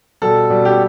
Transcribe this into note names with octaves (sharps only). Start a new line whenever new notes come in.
B2 G3 A4
B2 G3
G4